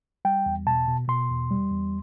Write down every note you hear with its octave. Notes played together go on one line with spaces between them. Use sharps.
G3 G5
E2
B2 A5
B2
B2 C6
E2
G3
E2